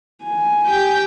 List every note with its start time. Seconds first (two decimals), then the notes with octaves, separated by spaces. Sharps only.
0.25 G#5
0.66 G4 G5